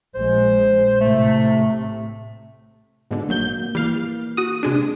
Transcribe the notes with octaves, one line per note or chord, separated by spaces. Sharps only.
A#1 G#3 C5
A2 C3 A3
G#2 B2 D3
G#1 F#3 A#3 G6
E3 G3 A#3 F5
F#4 D#6
C3 G#3 D4